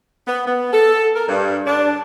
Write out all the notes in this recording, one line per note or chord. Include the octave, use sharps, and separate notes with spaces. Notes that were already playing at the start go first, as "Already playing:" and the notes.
B3
B3
A4
A#4
G2
D4